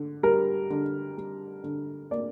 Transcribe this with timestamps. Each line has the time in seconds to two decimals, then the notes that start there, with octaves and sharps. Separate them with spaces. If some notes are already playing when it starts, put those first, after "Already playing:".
Already playing: D3
0.23 G3 A#4
0.70 D3
1.17 G3
1.64 D3
2.11 A#3 D5